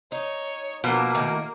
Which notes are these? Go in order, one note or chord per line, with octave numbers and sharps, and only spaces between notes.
D#4 C#5
B2 F3 A#3
A2 D#3